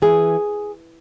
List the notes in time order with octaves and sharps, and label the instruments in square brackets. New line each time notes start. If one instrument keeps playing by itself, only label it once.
[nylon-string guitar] E3 G#4